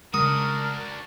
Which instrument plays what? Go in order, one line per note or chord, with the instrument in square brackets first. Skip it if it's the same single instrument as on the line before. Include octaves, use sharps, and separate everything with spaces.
[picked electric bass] C#3 G#3 [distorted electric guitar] D4 F#4 [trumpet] A#4 [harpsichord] D#6